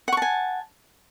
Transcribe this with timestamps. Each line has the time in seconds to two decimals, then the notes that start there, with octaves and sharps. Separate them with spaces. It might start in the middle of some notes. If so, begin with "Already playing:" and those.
0.08 F#5
0.13 C#6
0.17 A5
0.22 G#5